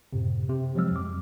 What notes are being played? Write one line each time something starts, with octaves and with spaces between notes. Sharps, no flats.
F#2 A2 C3
C3
F3 F#3 G#3 C4 E6 F6
F2 D6